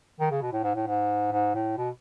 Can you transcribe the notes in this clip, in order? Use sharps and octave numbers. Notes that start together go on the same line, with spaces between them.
D#3
C#3
B2
A2
G#2
A2
G#2
G#2
A2
B2